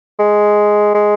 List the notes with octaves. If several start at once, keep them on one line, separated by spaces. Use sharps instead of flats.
G#3
G#3